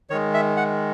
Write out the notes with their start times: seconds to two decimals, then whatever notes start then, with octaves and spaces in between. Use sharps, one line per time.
0.10 D#3 G#3 C#5
0.34 E5
0.57 F#5